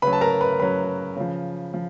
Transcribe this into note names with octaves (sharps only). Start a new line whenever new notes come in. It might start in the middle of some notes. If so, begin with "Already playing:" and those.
C#3 F#3 B4 B5
A5
A#4 A#5
B4 B5
C#3 F#3 B4 B5
C#3 F3
F3